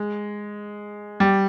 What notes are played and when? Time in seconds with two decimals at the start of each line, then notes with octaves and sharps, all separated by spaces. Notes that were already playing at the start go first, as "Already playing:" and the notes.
Already playing: G#3
1.20 G3